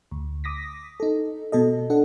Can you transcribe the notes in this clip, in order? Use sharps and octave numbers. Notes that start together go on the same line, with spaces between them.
D2
D6 D#6 A#6 B6
D#4 A4
B2 A4 D#5
D4 A4 F#5